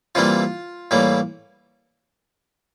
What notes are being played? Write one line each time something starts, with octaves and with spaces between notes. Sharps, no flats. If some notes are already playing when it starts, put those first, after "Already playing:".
C3 E3 G3 A#3 F4
A2 E3 G3 A#3